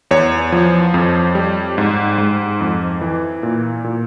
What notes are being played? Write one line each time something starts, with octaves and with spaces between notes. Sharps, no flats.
E2 C#5
F3
F2
G3
G#2
G#2
F2
E3
A#2
A#2